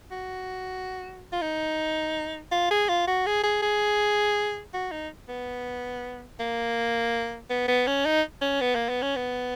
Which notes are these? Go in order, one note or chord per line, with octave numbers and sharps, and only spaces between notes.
F#4
F4
D#4
F4
G#4
F4
F#4
G#4
G#4
G#4
F#4
D#4
B3
A#3
B3
B3
C#4
D#4
C#4
B3
A#3
B3
C#4
B3